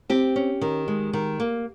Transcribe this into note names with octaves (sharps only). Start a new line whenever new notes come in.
C4 G4
C#4
D#3
G#3
D#3
A#3